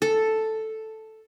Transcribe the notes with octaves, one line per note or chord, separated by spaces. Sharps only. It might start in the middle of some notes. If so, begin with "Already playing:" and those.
A4